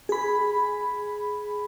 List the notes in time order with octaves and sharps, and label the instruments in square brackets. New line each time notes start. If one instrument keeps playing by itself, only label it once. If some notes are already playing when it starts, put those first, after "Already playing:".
[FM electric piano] G#4 B5